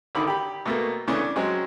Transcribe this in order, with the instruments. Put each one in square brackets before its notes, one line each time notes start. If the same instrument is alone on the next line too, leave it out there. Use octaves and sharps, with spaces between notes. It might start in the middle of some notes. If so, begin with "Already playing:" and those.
[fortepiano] G#1 D3 D#3 B5
G4 B5
B2 A3 A#3
C#3 E3 A3 B3 C#4 D4
D5
F#3 G#3 C4 C#4